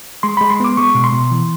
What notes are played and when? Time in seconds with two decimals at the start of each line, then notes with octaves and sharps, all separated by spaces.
0.23 G#3 C6
0.37 G#3 B5
0.50 C6
0.60 B3 D6
0.77 G#3 C#6
0.95 B2
1.04 C6
1.12 B2
1.31 E3